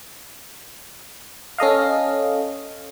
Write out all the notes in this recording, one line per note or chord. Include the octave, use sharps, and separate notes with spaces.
C#4 A4 D#5 F5